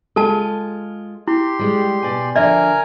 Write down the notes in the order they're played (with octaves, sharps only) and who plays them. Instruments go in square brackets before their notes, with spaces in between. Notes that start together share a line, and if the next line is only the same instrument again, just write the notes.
[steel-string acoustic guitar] G#3 F4 [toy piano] A4 A5
[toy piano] E4 [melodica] G4 C6
[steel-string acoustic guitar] G3 G#3
B2 D5 G#5
[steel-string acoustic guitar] D3 F3 [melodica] A#4 G#5 A#5 [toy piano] D5 E5